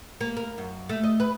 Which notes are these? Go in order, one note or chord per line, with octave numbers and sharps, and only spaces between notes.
A#3
A#4
F#2
A3
D#5
B4